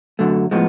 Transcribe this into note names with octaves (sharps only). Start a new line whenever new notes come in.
F#2 D3 F#3 A3
A2 F3 G#3 B3